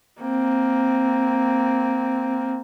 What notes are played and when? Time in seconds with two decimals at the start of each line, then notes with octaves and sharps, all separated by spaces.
0.21 A#3 C4